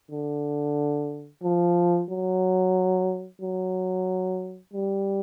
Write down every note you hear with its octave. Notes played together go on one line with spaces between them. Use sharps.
D3
F3
F#3
F#3
G3